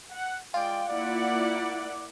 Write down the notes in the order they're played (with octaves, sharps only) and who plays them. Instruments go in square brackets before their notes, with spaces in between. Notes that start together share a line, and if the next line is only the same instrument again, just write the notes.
[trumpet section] F#5
[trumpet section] G#3 D5 G5 [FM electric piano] F4
[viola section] A#3 E4 F#5 [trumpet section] D5